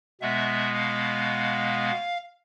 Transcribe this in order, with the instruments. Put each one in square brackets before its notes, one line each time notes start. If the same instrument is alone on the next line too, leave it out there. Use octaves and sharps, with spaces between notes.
[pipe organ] B2 G#3 B3 E5
F5